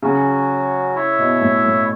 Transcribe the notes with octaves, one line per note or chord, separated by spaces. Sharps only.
C#3 F#3 C#4 F#4
E4 C#5 E5
B2
A2
A2